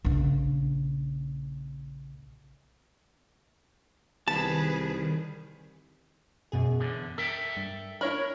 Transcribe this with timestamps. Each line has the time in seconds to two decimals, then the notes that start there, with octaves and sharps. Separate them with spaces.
0.05 A#1 C#3
4.28 C2 D#3 G#4 B4 A5
6.52 F#2 B2 G#4
6.80 E2 D3
7.18 A4 A#4 E5 G5
7.57 G2
8.01 D4 E4 A#4 C#5 B5